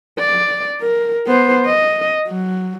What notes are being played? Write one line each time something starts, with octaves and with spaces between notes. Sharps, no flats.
D5
A#4
B3 C5
D#5
F#3